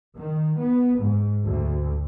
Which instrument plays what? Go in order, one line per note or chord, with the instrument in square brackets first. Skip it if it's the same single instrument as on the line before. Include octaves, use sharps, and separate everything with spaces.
[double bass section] D#3
B3
G#2
D2